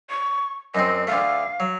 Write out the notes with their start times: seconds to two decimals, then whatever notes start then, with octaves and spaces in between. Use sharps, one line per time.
0.09 C#6
0.75 F#2 C4 D#5
1.07 D2 A3 F5
1.60 F#3